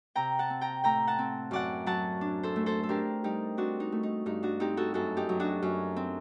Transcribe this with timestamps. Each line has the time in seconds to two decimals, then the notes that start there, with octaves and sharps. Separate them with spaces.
0.15 C3 G5 A#5
0.39 F#5 A5
0.50 C4
0.61 G5 A#5
0.84 A2 G5 A#5
1.07 F#5 A5
1.19 C4
1.51 F#2 D5 F#5
1.86 F#3 F#5 A5
2.21 D4
2.43 A4 C5
2.56 A3
2.66 A4 C5
2.83 A4
2.89 D4 G4 A#4
3.24 G3 D#4 G4
3.57 C4 D4 F#4
3.80 D#4
3.92 A3
4.03 D#4
4.26 G2 D#4
4.43 D4 F#4
4.60 C4 D#4 G4
4.77 F#4 A4
4.94 F#2 F#4 A4
5.17 D#4 G4
5.29 F#3
5.40 D4 F#4
5.62 F#2
5.96 C4